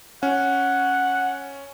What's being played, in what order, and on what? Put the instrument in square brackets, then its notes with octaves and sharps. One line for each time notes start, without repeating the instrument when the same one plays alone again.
[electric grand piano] C#4 [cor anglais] F#5